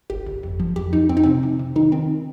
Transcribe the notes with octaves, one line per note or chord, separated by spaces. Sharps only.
G1 G4
G1
F2
F3
F2 G4
F2 D#4
F2 C4
D#4
C3 C4
C3
C3
D#3 D#4
D#3 C4